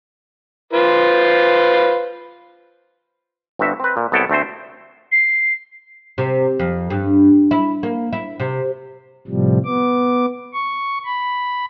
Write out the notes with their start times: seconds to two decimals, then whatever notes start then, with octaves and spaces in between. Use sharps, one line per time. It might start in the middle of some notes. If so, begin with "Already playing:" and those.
0.73 F4 B4 C5
3.59 G1 G2 C4 F#4 E5
3.80 C4 B4
3.97 A#2
4.12 C2 B3 A4 C#5 G5 A5
4.29 D2 A3 C4 C5
5.12 C7
6.18 C3
6.60 F2
6.90 G2
7.51 E4
7.83 A#3
8.13 E4
8.40 C3
9.28 A2 C3 F3 G3
9.65 B3 D6
10.53 C#6
11.05 B5